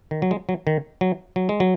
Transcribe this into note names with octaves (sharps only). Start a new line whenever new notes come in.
D#3
F#3
G#3
F#3
D#3
F#3
F#3
G#3
F#3